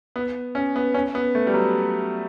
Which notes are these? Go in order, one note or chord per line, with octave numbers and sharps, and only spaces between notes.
B3
C#4
B3
C#4
B3
A3
G3
F#3